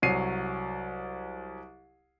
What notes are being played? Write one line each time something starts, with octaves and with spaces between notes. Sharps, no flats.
C2 F#3 C#5 C7 D#7